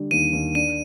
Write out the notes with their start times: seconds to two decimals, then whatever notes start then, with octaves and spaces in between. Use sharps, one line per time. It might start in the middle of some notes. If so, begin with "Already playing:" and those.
Already playing: D3 G3
0.11 D#2 D#7
0.33 D#2
0.55 D4 D#7